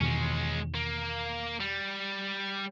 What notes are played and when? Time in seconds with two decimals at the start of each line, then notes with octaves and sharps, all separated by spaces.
0.01 E2 B2 D#3 G#3 C#4
0.75 A#3
1.60 G3